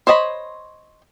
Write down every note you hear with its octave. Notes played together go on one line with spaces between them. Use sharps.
C5 C#5 D#5 A5 B5